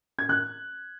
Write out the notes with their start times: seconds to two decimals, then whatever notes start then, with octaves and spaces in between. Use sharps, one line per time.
0.19 G#6
0.29 F#6